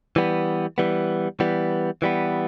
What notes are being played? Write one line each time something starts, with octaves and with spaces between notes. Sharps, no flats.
E3 G3 B3
E3 G3 B3
E3 G3 B3
E3 G3 B3